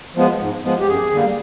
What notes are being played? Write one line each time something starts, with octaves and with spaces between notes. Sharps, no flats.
F3 G#3 B3
G#2
F3 G#3 B3
G4
F#2 G#4
D3 G3 A#3